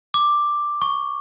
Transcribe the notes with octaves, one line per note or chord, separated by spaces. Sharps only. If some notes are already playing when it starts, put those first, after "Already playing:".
D6
C#6